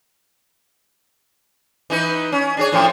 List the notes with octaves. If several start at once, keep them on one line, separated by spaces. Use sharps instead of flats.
E3 D#4 B4
C#4
D4 G#4 C#5
A2 F3 C#4